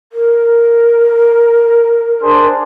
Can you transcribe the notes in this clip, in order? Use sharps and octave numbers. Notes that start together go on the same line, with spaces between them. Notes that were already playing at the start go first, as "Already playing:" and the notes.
A#4
D4 G#4 C5